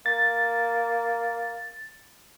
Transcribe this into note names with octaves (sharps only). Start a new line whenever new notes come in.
A#3 A6